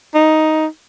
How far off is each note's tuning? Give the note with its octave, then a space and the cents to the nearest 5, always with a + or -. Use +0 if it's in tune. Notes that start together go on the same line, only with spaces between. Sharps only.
D#4 +5